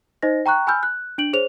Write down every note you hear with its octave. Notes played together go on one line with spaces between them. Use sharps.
D#4 C5 D#5 A#6
G5 A#5 C#6 F#6
G#5 B5 E6 F6 G6
F#6
D4 D7 F#7
G#4 C5 C#5 F7